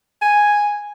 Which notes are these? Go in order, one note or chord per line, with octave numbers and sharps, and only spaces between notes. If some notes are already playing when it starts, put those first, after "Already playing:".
G#5